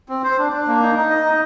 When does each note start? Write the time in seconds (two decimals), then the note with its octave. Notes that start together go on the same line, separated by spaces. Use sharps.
0.09 C4
0.24 C5
0.38 D4
0.53 D4
0.67 A#3
0.82 D#4
0.96 D#4
1.10 D#5
1.25 D#4